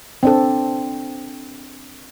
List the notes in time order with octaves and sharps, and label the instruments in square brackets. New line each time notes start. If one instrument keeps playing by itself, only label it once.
[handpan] C4 D4 A4